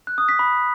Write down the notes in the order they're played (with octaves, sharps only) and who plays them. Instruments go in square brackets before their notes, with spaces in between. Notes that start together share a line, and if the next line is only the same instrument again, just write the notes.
[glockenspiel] F#6
D#6
B6
B5